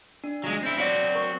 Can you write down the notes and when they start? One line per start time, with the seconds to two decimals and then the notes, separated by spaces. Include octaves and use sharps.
0.24 D4
0.44 F#3 G#3
0.63 C4 E4
0.78 F#3 C4 F#4 C#5 D5 B6
1.15 A#4 C#6